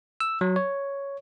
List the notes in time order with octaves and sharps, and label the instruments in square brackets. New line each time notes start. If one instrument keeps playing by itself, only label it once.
[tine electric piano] E6
F#3
C#5